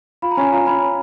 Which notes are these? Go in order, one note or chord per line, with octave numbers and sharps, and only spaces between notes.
F4 B5
A#5
C#4 G#5
F4 A#5
C#4 B5